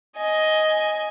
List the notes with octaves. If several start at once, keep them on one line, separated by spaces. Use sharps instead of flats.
D#5 G#5